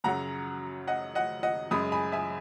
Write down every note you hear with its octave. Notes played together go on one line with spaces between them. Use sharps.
F#2 C#3 F#3 F#5 A#5
D#5 F#5
D#5 F#5
D#5 F#5
F#2 C#3 G#3 B5 D#6
G#5 B5
E5 G#5